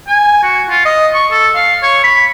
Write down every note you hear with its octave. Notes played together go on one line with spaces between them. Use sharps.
G#5
F#4
F4
D#5
C#6
A4
F5
C#5
B5